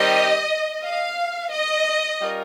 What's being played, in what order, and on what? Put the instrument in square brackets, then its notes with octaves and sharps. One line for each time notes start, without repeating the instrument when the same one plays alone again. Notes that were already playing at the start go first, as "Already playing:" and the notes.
Already playing: [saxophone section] D#3 G3 C4 G4 [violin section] D#5
[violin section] F5
D#5
[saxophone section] G3 C#4 F4 A#4